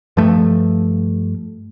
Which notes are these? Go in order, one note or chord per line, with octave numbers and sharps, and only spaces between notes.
G2 F3 A3